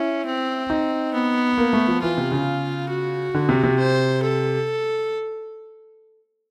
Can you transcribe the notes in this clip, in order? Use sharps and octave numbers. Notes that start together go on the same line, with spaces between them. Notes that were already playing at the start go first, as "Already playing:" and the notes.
Already playing: C#4 E4
C4
D#4
B3
A#3
A3
F3
E3 F4
C3
C#3
F#4
D3
C3
C3
C5
A4